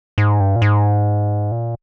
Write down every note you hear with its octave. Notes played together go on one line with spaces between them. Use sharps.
G#2
G2
A#2
G#2
A#2